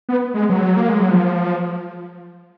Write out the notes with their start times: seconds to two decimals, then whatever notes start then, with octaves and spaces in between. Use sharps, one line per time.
0.09 B3
0.34 G#3
0.50 F#3
0.77 A#3
0.89 G#3
1.00 F#3
1.11 F3